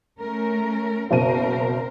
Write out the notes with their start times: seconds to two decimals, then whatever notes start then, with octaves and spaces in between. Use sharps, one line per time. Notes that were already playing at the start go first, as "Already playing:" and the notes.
0.20 A3 C#4 A#4
1.11 F#1 B2 C4 A#4 C5 D#7